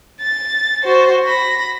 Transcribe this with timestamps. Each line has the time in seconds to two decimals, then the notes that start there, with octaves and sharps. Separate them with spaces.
0.21 A6
0.84 F#4 C5
1.24 B5 A#6